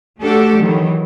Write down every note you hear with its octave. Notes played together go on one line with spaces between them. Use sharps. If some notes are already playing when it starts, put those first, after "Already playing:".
A3 D4 F#4 G4 A4
D#3 E3 F#3